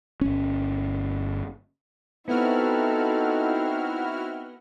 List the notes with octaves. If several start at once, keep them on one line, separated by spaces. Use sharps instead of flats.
G1 C#4
B3 C4 D#4 E4 F#4 A4 F6